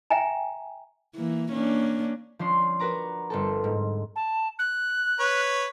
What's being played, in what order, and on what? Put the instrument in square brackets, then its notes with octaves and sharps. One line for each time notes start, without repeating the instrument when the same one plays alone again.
[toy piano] E5 G5 G#5 A#5
[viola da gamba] E3 A#3
A#3 C#4 D4
[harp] F3 C#4 D4 C6
F#4 A#4 B4 A#5 D6
G1 C4 A4
G#2
[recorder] A5
F#6
[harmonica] B4 C#5